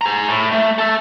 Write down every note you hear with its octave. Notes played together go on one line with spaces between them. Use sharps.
G#4 A#5
A2
A3
A4 E5